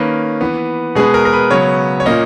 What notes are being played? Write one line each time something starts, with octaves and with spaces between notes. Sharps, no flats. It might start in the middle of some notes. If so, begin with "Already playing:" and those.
Already playing: D#3 A#3 C#4 B4
E3 B3
B2 G#3 B3 G#4
A#4
A#4
B4
C#3 F#3 B3 C#5
C#5
A#2 A#3 C#4 D#5